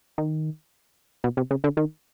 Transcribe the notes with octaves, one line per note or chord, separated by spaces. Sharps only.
D#3
B2
C3
C#3
D3
D#3